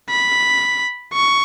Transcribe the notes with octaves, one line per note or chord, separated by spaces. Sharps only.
B5
C#6